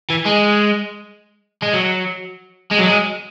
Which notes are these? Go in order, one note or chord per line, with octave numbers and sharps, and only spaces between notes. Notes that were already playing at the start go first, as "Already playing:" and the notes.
E3
G#3
G#3
F#3
G#3
F#3
G#3